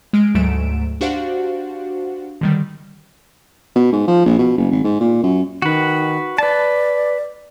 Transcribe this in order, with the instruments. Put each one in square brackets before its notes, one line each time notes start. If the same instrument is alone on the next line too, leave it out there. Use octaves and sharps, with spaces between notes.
[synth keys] G#3 F6 D7
D2 G#2 F#3 A3 D7 E7
D4 F#4 G4 C5 F5 F#5
D3 D#3 G3
[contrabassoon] B2
G#2
F3
A#1
B2
F#1
G#1
G#2
A#2
F#2
[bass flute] D#3 [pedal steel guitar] F#4 B4
[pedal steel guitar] B4 A5 [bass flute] D5